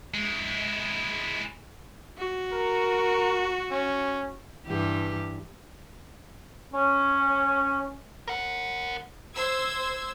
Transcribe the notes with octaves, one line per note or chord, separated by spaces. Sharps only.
G#3 E4
F#4
A#4
C#4
G2 E3 G4
C#4
A#4 F#5
C5 E6 G#6